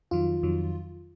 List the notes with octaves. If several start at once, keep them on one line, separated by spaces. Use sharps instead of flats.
F2 D#3 F#3 F4
F2 D#3 F#3